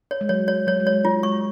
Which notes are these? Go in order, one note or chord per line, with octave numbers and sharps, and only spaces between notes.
C#5
G#3
F#3 C#5
C#5
F#3 C#5
G#3
C#5
G#3
F#3 F4
G#3 C#6